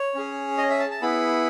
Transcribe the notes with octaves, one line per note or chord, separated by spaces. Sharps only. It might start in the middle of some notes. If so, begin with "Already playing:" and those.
Already playing: C#5
C#4 G#4
D#5
E5
A5
A5
B3 E4 G#4 B5